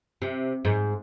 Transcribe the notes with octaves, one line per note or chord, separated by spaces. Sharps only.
C3
G#2